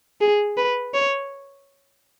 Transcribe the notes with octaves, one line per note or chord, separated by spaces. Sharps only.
G#4
B4
C#5